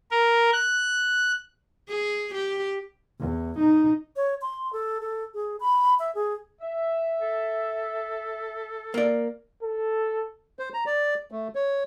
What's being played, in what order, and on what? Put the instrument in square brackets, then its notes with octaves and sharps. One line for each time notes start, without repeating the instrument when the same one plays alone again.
[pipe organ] A#4
F#6
[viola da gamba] G#4
G4
[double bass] E2
D#4
[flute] C#5
C6
A4
A4
G#4
B5
E5
G#4
[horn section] E5
[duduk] A4
[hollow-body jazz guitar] A#3 D5
[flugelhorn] A4
[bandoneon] C5
A#5
D5
A3
C#5